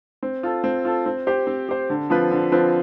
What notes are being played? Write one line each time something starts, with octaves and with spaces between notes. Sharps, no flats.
C4
F4 A4
C4
F4 A4
C4
G4 C5
C4
G4 C5
D3
F3 C4 F4 B4
D3
F3 C4 F4 B4